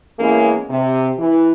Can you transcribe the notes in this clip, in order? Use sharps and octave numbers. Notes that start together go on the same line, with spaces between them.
E3 G#3 A#3 B3 C#4 G#4
C3
E3